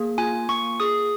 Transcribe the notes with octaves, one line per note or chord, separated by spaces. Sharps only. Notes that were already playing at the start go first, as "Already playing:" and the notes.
Already playing: A#3 G#4
F4 G#5
A#3 C#6
G#4 D#6